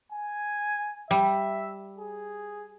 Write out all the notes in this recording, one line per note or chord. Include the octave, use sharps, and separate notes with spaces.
G#5
G3 E5
G#4